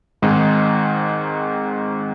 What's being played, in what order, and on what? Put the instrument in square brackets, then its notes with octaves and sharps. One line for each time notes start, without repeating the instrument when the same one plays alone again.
[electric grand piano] G#2 D#3 G#3 C4 D#4